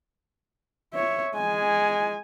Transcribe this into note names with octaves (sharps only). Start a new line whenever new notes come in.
C#5 E5
G#3 G#5